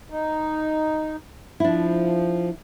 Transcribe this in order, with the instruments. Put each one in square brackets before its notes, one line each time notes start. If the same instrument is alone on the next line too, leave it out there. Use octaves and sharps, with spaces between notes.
[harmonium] D#4
[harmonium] F3 [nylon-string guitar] D4 E4